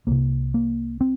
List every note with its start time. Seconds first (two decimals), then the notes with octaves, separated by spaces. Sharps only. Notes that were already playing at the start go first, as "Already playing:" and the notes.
0.07 C2 C3 A#3
0.54 A#3
1.01 C4